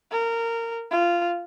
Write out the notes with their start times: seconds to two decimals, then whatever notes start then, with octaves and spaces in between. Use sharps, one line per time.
0.11 A#4
0.91 F4